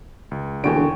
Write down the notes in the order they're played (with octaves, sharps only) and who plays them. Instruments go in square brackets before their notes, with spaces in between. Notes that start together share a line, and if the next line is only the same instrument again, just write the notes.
[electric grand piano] C#2
[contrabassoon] E1 [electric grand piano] D#2 D7 [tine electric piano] D3 [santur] C#5 G5 G#5